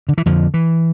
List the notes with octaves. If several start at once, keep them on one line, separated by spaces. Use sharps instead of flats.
D3
E3
F2 D3 F3
E3